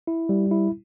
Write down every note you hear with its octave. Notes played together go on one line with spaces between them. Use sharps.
E4
G3
E4